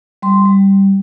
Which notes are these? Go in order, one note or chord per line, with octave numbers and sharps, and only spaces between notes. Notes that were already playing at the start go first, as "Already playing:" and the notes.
G3 C6
G3